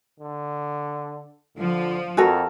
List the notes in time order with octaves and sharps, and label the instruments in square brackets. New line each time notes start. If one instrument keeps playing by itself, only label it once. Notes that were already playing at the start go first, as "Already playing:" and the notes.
[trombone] D3
[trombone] D3 [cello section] F3
[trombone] F2 [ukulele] F#4 A4 A#4